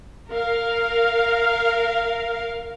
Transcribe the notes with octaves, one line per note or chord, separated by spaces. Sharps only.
A#4 F5